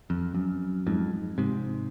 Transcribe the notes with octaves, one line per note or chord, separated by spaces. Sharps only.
F2
F#2
F2 G#2
G#2 C3